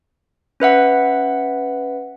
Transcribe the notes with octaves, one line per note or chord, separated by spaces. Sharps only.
C#4 B4 E5 F#5